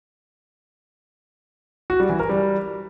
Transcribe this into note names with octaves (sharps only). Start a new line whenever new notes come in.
F#4
G3
E3
A#4
G3